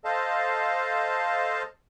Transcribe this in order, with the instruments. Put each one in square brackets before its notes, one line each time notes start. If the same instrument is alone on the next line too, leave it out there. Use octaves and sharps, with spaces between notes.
[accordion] A4 C5 D#5 F5 A5